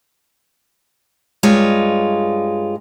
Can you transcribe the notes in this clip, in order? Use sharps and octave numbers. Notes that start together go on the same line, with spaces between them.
G2 G#3 F4 C#5